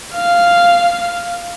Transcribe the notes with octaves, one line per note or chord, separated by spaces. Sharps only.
F5